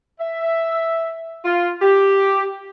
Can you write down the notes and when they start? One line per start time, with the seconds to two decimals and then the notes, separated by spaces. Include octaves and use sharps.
0.20 E5
1.45 F4
1.82 G4